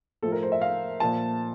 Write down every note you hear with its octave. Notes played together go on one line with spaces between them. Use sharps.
A2 F3 A4
A#4
C5
E5
F5
A#2 F3 A5